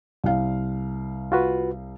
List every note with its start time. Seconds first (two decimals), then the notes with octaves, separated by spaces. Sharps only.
0.24 C2 F5
1.32 F4 F#4 B4